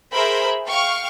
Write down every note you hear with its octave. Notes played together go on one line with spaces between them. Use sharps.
G#4 A#4 C5 E5 B5
F5 G5 C#6 F6